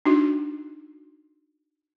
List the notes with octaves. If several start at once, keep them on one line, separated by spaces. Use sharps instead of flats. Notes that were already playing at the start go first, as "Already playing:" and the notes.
D4 D#4 F#4